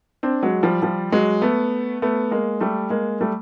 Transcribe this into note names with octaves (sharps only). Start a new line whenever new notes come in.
C4 D4
F#3 G#3
F3 G3
F3 G3
F#3 G#3
A3 B3
A3 B3
G#3 A#3
G3 A3
G#3 A#3
G3 A3